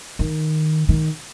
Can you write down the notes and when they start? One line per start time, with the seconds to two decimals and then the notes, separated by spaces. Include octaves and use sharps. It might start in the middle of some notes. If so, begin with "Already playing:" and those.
0.19 D#3
0.89 D#3